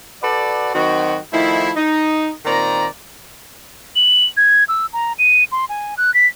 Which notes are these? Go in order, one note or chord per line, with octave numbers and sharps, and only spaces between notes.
F#4 A4 B4 D5
D#3 F#3 C4 F#4
D#3 F3 A3 E4
D#4
A#2 D#3 C4 D5 A#5
F#7
G#6
E6
A#5
D#7
C6
G#5
F#6
B6